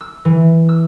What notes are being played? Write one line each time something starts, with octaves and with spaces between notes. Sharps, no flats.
E6
E3
E6